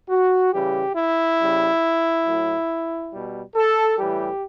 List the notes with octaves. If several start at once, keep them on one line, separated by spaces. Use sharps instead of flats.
F#4
C#3 E3 G3 G4
E4
C#3 G3
A2 F#3
B2 G3
A4
A2 E3 G3 G4